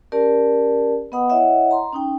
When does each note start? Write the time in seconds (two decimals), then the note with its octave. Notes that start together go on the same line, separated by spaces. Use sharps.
0.12 C#4 G4 A#4 D5 A5
1.12 B3 B4 D#5 F#5 B5 D#6
1.30 E4 C#5 D#5 E5 F#5
1.71 A#5 C6
1.93 C#4 D#4 G5